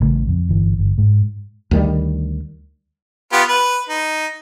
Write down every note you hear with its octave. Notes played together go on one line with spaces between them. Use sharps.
A1 C#3 A3
F2
G1 E3
G1
G#2 G#3
D2 D#3 G3
B3 F4 G4
B4
D#4